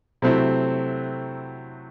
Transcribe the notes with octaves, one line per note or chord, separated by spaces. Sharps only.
C3 F#3 A3 C4 E4